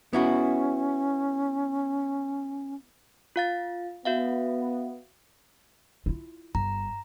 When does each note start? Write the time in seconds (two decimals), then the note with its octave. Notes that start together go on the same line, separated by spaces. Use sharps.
0.13 B3 C#4 E4 F#4
3.36 F4 F5 A6
4.05 B3 F#4 E5 F5
6.06 E4 F4
6.55 G1 A#5